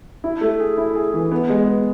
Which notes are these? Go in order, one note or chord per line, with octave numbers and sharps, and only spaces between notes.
E4
A3
G#4
E4
G#4
E3
B3
G#3
B3